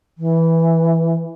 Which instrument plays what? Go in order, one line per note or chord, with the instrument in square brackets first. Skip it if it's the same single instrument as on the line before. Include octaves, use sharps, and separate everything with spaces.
[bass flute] E3